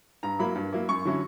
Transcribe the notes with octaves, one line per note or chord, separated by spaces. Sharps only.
G2 A#5
F#3 A#3 E4 B5
G2
F#3 A#3 E4
F#2 C#6
D3 F#3 C#4 E4